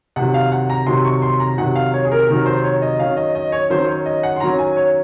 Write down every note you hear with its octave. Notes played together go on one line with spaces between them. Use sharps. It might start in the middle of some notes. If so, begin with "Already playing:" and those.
C3 D#3 F#3 F#5
F5
F#5
A#5
C3 D#3 F#3 C6
C#6
C6
A#5
C3 D#3 F#3 F#5
F5
C#5
G#4
A#4
C3 D#3 F#3 A#4
C5
C#5
D#5
D#3 F#3 C#4 F5
D#5
D#5
C#5
D#3 F#3 C#4 C5
C#5
D#5
F#5
C6
D#3 F#3 C#4 A#5
G#5
C#5